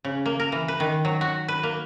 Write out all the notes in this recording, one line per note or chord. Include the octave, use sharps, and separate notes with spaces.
C#3
A#3
A#4
E3
B4
D#3
F#3
F#4
B4
A#3